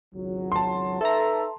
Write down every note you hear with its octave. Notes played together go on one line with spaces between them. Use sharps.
G#1 C#2 F#3
A5 C6
D#4 A4 B4 E5 A#5